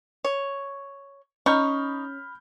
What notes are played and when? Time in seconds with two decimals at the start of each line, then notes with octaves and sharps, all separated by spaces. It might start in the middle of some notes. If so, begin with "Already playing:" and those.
0.25 C#5
1.46 C#4 D#4 B5 C#6 F6 G6